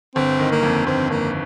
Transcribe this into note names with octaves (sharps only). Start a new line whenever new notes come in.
G1 C4
D#3
A#3
F2
G1 C4
G1 A#3